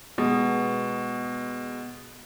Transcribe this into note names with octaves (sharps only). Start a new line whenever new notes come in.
B2 G#3 B3